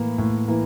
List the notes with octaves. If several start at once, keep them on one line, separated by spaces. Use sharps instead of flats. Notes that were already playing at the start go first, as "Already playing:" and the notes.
Already playing: A2 E3 A#3
A2
E3 A#3